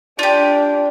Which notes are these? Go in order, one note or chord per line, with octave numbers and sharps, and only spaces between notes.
D4 F4 G4